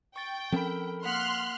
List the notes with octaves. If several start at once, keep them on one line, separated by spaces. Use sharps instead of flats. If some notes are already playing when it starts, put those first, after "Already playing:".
G5 C#6 A6
F3 C4 C#4 A4 A#4 B5
A#3 F#5 C6 F6 F#6 B6